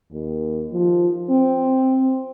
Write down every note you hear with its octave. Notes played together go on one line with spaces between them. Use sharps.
D#2
F3
C4